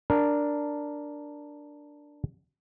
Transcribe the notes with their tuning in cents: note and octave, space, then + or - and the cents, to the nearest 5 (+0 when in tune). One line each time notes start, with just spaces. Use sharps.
D4 +0 A#4 +0